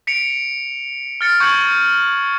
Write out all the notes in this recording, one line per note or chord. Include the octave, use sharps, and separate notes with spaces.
B6 C#7 D7 F7
F6 A6 C#7
C#6 G6 G#6 C#7 F#7